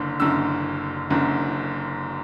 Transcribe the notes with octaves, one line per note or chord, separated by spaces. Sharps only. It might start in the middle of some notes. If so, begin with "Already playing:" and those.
Already playing: F#1 F#2 D3
F#1 F#2 D3 E6
F#1 F#2 D3